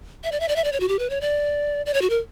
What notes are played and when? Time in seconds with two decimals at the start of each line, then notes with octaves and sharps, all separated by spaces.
0.24 E5
0.32 D5
0.40 E5
0.48 D5
0.56 E5
0.64 D5
0.72 C#5
0.80 F#4
0.89 G4
0.99 B4
1.10 C#5
1.21 D5
1.86 D5
1.94 C#5
2.02 F#4
2.10 A#4